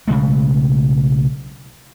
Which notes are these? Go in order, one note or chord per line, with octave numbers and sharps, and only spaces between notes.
B1 C#3 G#3 A3